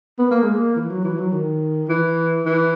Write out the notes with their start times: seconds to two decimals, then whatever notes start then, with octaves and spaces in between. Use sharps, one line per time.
0.18 B3
0.30 A#3
0.42 G#3
0.54 A#3
0.75 E3
0.89 F#3
1.04 E3
1.18 F#3
1.32 D#3
1.88 E3
2.45 E3